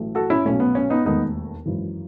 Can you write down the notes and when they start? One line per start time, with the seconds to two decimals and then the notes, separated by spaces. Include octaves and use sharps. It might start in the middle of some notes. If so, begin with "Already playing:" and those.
Already playing: A1 A2 F#3 A3
0.15 F#4 A4
0.30 C#4 E4
0.45 B1 B2 A3 C#4
0.60 B3
0.75 C#4
0.90 B3 D#4
1.05 E1 D#2 D#3 A3 B3 D#4
1.66 G#1 F#2 E3